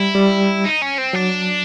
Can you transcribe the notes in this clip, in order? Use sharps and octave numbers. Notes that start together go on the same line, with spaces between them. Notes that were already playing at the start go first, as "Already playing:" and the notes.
Already playing: G3 E4
G3
D#4
C#4
C4
F#3 D4